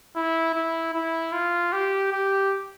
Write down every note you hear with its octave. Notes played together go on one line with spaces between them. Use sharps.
E4
E4
E4
F4
G4
G4